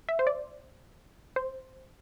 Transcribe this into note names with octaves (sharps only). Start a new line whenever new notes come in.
E5
C5
D5
C5